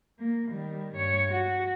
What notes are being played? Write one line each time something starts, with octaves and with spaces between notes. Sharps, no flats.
A#3
D#3 G3
G2 C#5
F#4